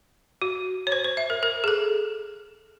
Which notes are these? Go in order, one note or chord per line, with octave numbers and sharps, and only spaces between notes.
F#4
C#5
C5
C5
E5
A#4
A#4
G#4
A4